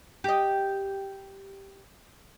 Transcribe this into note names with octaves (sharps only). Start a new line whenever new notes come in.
G4 D#5